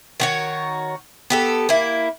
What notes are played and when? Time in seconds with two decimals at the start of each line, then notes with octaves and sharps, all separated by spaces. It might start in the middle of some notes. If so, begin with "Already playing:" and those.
0.20 D#3 F#4 C#5
1.30 B3 G4 A4
1.69 A#3 E4